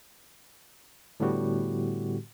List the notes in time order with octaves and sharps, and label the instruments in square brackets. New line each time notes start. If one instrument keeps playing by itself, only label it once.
[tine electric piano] A2 D3 G3 B3 F#4 G4